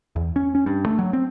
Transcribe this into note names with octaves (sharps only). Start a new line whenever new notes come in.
E2
C#4
C#4
G2
A3
F#3
C4